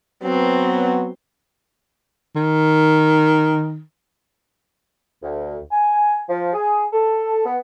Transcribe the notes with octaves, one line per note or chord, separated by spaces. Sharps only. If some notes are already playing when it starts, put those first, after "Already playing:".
F#3 B3 C4
D#3
D2
G#5
F3
G#4
A4
B3